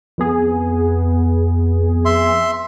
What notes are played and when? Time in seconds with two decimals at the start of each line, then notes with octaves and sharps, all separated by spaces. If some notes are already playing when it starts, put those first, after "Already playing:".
0.18 F2 B3 G#4
2.05 E5 C6